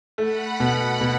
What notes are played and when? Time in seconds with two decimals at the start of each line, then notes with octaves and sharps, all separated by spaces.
0.18 A3 F#5 B5
0.60 B2
1.01 B2